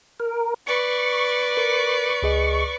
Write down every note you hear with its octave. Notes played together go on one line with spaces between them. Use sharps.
A#4
B4 D5 C#6
A#4
C#2 G#4 D#5